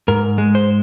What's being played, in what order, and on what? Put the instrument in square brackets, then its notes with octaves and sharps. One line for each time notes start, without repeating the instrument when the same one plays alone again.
[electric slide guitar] G#2 A#4
G#3
C5